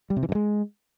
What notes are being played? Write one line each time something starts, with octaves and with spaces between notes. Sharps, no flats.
G3
C3
E3
G2
G#3